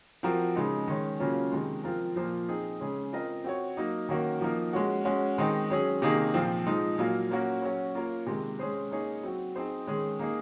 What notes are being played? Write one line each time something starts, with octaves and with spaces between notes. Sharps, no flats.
F3 C4 F#4 A#4
C#3 G#3 D#4
D#3 G#3 C#4
C#3 F#3 A#3 C#4 F4
C3 D#3 G#3
F3 C4 F4 A#4
A#2 F3 A#3 F4 C5
C4 D#4 G#4
C#3 G#3 C#4 G#4
C4 F4 A#4 D#5
C4 F#4 C#5
F#3 A#3 D#4
D#3 A#3 C#4 F#4 A#4
F3 A#3 D#4 A#4
G#3 C#4 F#4
G#3 C#4 F#4
D#3 G#3 C4 D#4
F#3 C#4 G#4
C3 D#3 A#3 D#4 G#4
A#2 F3 C4
F3 G#3 D#4
A#2 F#3 A#3 F4
F#3 A#3 C#4 F#4 A#4
F#3 C#4 F#4
A#3 F4 A#4 C#5
C3 D#3 G#3
G#3 C#4 G#4 C5
A#3 D#4 G#4 C#5
F#3 C4 F#4
C4 D#4 G#4 C5
D#3 G#3 C#4 G#4
A#3 D#4 G#4